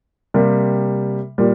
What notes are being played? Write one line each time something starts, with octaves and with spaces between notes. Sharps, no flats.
C3 G3 A#3
A#2 G3 A#3